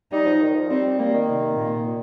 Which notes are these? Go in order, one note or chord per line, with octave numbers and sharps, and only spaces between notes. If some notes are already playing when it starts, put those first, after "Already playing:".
G3 D#4
F3
D#3
F3
G3 C4
G3 A#3
D#3
C3
A#2
A#2